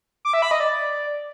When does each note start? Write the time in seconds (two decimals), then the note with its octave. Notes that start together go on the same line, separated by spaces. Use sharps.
0.25 D6
0.33 E5
0.42 B5
0.51 D#5
0.60 D5